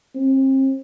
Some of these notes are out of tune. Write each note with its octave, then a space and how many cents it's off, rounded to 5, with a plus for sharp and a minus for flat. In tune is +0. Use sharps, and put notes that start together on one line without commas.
C4 +35